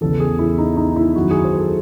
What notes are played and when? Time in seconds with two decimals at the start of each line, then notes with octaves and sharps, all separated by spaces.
0.01 E2 C#3 E3 A4
0.20 G#4
0.39 E4
0.58 D#4
0.77 D#4
0.96 E4
1.15 F#2 D#3 F#3 F#4
1.31 G#4
1.44 C5
1.59 A4